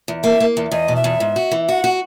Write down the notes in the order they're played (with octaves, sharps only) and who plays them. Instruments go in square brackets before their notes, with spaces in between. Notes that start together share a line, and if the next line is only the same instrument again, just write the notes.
[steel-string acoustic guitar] E2
[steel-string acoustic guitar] A#3 [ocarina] E5
[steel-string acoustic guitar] A#3
E2
[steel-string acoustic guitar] E2 [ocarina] D#5
[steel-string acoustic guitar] B2
[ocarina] E5
[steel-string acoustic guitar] E2
G#2
F#4
E3
[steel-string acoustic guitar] F#4 [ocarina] F#5
[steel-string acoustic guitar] F#4